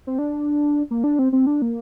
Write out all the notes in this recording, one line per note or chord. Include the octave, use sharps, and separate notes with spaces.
C4
D4
A#3
D4
C4
C4
D4
A#3